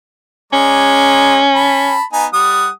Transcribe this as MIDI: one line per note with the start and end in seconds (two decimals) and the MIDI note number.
0.53 1.42 56
0.53 1.95 61
0.53 1.42 74
0.53 1.42 82
1.55 2.03 81
1.55 2.03 83
2.13 2.26 59
2.13 2.26 63
2.13 2.26 80
2.33 2.69 55
2.33 2.69 78
2.33 2.69 87